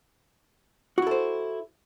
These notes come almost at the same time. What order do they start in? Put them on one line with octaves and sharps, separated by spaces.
F#4 E4 A4 C5